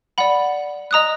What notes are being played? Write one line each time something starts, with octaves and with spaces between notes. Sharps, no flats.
D5 F#5 B5
D#5 A#5 D#6 F#6